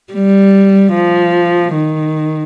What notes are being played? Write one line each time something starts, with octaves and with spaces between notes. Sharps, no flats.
G3
F3
D#3